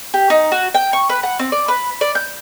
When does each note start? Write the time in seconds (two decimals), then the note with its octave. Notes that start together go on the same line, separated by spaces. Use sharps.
0.14 G4
0.30 D#4
0.52 F#4
0.74 G5
0.93 C#6
1.09 B4
1.23 F#5
1.39 C4
1.52 D5
1.68 B4
2.01 D5
2.15 G6